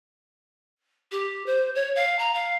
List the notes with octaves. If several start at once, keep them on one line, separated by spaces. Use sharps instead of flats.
G4
C5
C#5
F5
A#5
F5